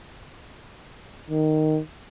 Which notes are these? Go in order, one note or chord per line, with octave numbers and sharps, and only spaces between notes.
D#3